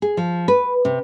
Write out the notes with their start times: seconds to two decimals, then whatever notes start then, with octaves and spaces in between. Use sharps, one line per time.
0.02 G#4
0.17 F3
0.48 B4
0.85 C3